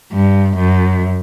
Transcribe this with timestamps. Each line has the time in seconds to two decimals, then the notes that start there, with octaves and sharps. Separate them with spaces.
0.13 G2
0.57 F#2